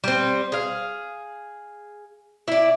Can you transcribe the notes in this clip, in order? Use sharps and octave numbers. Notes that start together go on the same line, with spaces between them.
G3 C4
G#4 F5
E4 D5